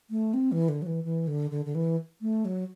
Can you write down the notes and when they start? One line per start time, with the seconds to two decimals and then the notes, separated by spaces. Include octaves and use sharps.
0.10 A3
0.34 C4
0.52 E3
0.68 D3
0.82 F#3
0.87 E3
1.04 E3
1.27 D3
1.51 D3
1.65 D3
1.75 E3
2.21 A3
2.45 F#3